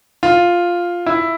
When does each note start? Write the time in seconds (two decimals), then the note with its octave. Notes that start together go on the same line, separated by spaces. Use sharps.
0.23 F4
1.06 E4